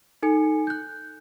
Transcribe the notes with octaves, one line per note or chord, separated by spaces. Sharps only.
D#4 A4 G#5 C#7
F#6 G6